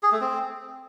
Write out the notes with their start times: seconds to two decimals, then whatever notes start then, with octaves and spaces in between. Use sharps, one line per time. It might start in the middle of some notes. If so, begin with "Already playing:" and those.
0.03 G#4
0.12 A3
0.21 C4